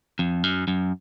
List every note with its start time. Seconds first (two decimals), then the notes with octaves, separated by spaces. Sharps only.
0.19 F2
0.44 F#2
0.68 F#2